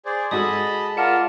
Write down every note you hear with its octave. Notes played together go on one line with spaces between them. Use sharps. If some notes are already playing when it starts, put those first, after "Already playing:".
G#4 C5 D5
G#3 F#4 A4 D#5 A5 B5 D#6
F4 A#4 D5 F#5 A5 F6